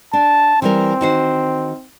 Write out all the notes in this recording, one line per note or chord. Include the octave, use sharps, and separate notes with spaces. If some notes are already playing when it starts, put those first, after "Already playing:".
D4 A5
E3 G3 C4 A#4
D#3 F#4 C5